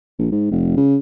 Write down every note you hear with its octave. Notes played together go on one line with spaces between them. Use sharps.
A#1
G#2
F1
C#3